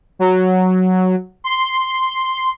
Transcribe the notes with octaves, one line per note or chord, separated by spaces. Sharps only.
F#3
C6